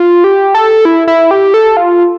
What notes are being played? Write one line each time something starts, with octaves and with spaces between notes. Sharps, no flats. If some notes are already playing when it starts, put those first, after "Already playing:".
Already playing: F4
G4
A4
E4
E4
G4
A4
F4